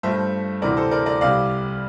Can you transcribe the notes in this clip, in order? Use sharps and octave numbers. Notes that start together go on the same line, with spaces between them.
G2 F3 A3 C5 E5
D2 C3 E3 A#4 D5
A4 C5
A#4 D5
A#4 D5
C2 C3 G3 D5 F5